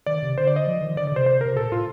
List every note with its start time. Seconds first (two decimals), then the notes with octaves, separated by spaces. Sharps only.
0.06 D#3 D5
0.23 C3
0.38 D3 C5
0.47 D5
0.56 D#5
0.67 F3
0.81 D#3
0.96 D3 D5
1.07 D5
1.12 C3 C5
1.26 C5
1.41 C3 A#4
1.56 A#2 A4
1.72 A2 F4